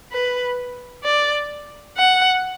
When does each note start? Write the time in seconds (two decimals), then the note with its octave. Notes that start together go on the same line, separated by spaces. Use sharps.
0.12 B4
1.03 D5
1.97 F#5